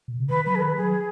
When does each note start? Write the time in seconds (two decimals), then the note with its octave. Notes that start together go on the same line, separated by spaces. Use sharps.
0.08 B2
0.19 C#3
0.29 D#3 B4
0.46 F#3 B4
0.55 G#4
0.61 D#3 B4
0.77 F#3 G#4